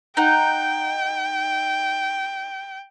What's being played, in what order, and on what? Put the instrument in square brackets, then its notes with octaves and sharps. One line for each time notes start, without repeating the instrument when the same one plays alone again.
[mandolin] D#4 F#5 [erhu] G5